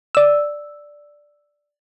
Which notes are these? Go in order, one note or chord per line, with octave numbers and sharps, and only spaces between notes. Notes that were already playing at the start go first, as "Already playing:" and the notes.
D5 E6